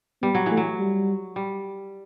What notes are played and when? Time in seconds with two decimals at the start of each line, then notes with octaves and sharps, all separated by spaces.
0.22 G3 B3
0.35 F#3
0.46 E3
0.51 A3
0.57 F#3
0.80 G3
1.36 G3